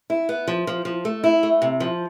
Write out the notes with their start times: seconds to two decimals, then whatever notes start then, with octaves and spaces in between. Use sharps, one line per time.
0.10 E4
0.29 B3
0.48 F3
0.67 F3
0.85 F3
1.05 A3
1.24 E4
1.43 A3
1.62 C3
1.80 F3